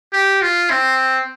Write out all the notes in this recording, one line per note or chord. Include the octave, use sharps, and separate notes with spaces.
G4
F4
C4